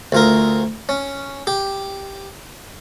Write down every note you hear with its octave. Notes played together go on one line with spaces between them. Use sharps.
D2 F4 A#4
C#4
G4